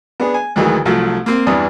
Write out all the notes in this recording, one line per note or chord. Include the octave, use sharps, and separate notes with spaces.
B3 D4 G#4
G#5
D2 D#3 E3 F#3 G#3
C2 F3 F#3 A3
A#3 C4
E2 G2 E3 D4 D#6